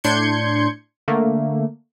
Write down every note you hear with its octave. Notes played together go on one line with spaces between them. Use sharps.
A2 D4 C6 G6 G#6 C#7
D3 A3 A#3